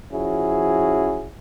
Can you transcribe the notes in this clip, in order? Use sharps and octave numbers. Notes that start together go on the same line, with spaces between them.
F3 C#4 E4 F#4 G#4